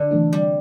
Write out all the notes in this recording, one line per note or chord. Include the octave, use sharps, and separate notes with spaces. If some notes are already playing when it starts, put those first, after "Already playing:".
Already playing: D3
C3 E3 A3 D4
C3 G3